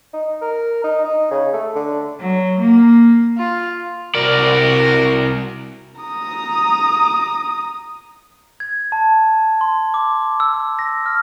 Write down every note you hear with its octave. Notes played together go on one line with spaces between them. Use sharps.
D#4
A#4
D#4
D#4
C#3
A3
D3
F#3
A#3
F4
C2 F#4 A#4 D5
A#5 D#6
G#6
A5
C6
D6
E6
A#6
F6